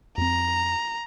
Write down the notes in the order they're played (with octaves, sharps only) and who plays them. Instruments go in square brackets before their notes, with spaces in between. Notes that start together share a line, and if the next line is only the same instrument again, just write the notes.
[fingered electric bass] F2 C4 [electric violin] A#5